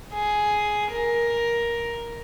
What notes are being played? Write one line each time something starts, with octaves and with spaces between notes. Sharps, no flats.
G#4
A#4